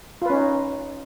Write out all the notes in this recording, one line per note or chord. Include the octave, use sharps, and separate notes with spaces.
C#4 D#4 F4 B4